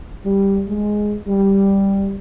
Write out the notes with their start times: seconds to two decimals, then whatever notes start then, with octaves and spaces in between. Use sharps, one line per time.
0.25 G3
0.69 G#3
1.27 G3